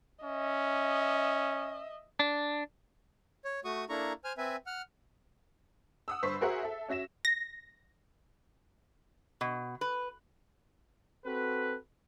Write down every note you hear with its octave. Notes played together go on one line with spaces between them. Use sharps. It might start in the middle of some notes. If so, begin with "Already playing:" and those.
C#4 D#5 E5
D4
C#5
A3 F#4 C#6 D#6
A#3 D4 E4 A4 A#5 C#6
C5 G#5 F6
C4 B4 E5 G#5
F#5 F6
F#5 D#6 E6
G1 G2 B4 C5 C#6 B6
F#4 G#4 A#4 C5 E5 F#5
A4 E5
C#4 F#4 E5 A#6 E7
A#6
B2
B4
C4 F#4 A4 B4